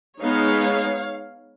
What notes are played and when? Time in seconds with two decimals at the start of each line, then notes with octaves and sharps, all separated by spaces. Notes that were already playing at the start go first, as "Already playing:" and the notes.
0.21 G#3 B3 D#4 C#5 F5